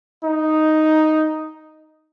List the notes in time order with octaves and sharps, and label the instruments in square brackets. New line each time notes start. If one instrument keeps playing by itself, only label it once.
[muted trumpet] D#4